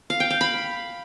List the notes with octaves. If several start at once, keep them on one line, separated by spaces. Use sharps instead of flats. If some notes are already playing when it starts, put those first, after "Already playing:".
F5
G5
F5
B5